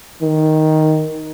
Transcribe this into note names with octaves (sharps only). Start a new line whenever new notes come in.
D#3